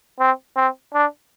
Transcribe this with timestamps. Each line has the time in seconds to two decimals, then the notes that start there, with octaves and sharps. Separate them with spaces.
0.20 C4
0.56 C4
0.94 D4